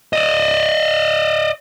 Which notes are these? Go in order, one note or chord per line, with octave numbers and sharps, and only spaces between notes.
D5 D#5